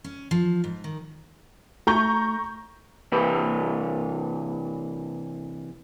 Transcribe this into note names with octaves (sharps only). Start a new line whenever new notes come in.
C#4
F3
G#2
D#3
A3 A#5 C#6 G6
C3 E3 B4